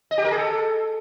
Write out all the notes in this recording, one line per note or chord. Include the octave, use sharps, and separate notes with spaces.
D#5
G4
A#4
G#4
A4